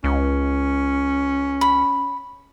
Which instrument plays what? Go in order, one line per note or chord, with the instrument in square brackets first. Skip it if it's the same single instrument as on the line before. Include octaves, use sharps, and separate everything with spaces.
[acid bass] C#2 [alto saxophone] C#4
[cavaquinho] B5